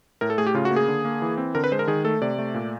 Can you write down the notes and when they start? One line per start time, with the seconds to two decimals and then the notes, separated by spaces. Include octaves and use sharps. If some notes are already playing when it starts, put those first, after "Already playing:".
0.21 A2 A#4
0.30 A4
0.38 A3 G#4
0.47 G4
0.54 C#3 F4
0.65 F#4
0.71 A#3
0.76 G#4
0.88 D3
1.05 A#3
1.22 E3
1.37 C4
1.55 D3 A#4
1.64 B4
1.72 G#3 C5
1.79 A#4
1.88 D#3 G#4
2.04 A3 A4
2.21 C3 D5
2.38 A3
2.54 A#2